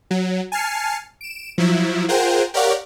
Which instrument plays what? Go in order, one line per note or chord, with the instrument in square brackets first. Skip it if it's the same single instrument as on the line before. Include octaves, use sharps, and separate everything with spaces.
[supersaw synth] F#3
G#5 A5 F6 C7 C#7
D7 E7
F3 F#3 E4
F4 G#4 A#4 C5 F#5 G5
G4 A#4 C#5 D5 F5 F#5